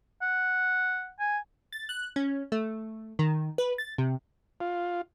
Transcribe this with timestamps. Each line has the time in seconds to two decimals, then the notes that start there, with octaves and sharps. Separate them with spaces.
0.22 F#5
1.19 G#5
1.72 A6
1.89 F#6
2.16 C#4
2.52 A3
3.19 D#3
3.58 B4
3.78 A6
3.98 C3
4.60 F4